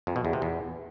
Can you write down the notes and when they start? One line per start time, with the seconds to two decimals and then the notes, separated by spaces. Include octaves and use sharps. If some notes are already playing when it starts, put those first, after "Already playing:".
0.07 F2
0.16 B2
0.25 E2
0.33 C3
0.42 E2